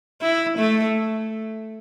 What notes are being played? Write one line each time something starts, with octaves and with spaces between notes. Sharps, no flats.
E4
A3